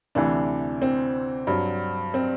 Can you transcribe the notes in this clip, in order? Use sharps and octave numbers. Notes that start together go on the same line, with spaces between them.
D2 C3 E3 D4
C4
G2 F#3
C4